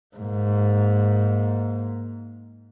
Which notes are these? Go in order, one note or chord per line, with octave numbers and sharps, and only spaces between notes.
G#2 A#3